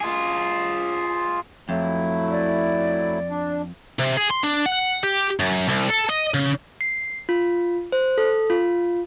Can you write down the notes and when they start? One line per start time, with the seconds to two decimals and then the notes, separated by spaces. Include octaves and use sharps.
0.01 F4 G#4
1.69 F2 F#3 A3 E4
2.31 D5
3.30 D4
4.00 C3
4.17 G#4
4.31 C6
4.44 D4
4.66 F#5
5.03 G4
5.39 F#2
5.68 C2
5.89 A4
6.09 D#5
6.34 C#3
6.81 C7
7.29 F4
7.92 C5
8.18 A4
8.50 F4